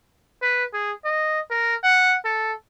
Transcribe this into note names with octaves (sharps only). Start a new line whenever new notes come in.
B4
G#4
D#5
A#4
F#5
A4